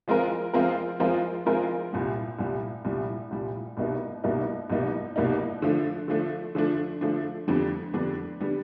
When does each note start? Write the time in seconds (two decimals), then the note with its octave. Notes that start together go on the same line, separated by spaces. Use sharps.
0.08 F3 G#3 C4 F4 A#4
0.53 F3 G#3 C4 F4 A#4
1.00 F3 G#3 C4 F4 A#4
1.46 F3 G#3 C4 F4 A#4
1.93 C2 A#2 G3
2.39 C2 A#2 G3
2.85 C2 A#2 G3
3.31 C2 A#2 G3
3.77 C2 B2 G3 A#3 D#4
4.24 C2 B2 G3 A#3 D#4
4.70 C2 B2 G3 A#3 D#4
5.16 C2 B2 G3 A#3 D#4
5.62 D3 F3 A3 D4
6.08 D3 F3 A3 D4
6.55 D3 F3 A3 D4
7.01 D3 F3 A3 D4
7.48 F2 D3 G3 B3 D4
7.94 F2 D3 G3 B3 D4
8.40 D3 G3 B3 D4